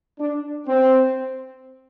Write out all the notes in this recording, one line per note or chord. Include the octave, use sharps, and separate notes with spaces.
D4
C4